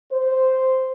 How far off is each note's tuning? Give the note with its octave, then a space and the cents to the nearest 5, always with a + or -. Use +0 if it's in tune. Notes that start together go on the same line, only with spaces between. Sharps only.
C5 -5